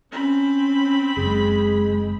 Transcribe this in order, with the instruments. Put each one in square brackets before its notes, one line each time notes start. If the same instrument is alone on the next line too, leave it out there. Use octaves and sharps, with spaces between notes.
[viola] C4 B5 [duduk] C#4
[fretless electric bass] F#1 [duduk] G#3 [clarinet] G#4